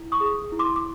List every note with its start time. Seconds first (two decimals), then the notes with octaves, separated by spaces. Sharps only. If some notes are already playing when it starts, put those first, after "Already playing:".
Already playing: E4
0.12 C#6 D#6
0.20 G#4
0.52 E4
0.59 C6 D6
0.76 D6